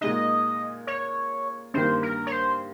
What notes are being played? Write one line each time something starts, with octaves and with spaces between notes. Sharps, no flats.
A#2 G#3 D#4 D#5
C#5
G2 D#3 A#3 C5
A#4
C#5
C5